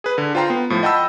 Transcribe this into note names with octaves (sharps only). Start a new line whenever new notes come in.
G#4 B4
D3
F4 C5 G5 A#5 C6
B3
A2 F3
D#5 F#5 G5 A5 B5 E6